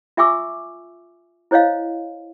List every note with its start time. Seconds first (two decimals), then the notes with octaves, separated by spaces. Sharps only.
0.17 F4 E5 G#5 C#6 D6 E6
1.51 E4 C5 C#5 D#5 F5